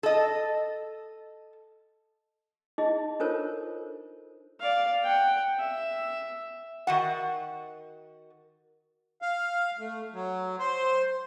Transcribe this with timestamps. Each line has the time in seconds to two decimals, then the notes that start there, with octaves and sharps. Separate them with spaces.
0.03 A4 D#5
2.78 D#4 E4 G#4 D#5
3.20 D4 F4 A4 A#4 C5 C#5
4.60 D5 F5
5.03 F#5 G5
5.59 E5
6.87 D#3 F#4 F#5
9.22 F5
9.79 A3
10.14 F#3
10.59 C5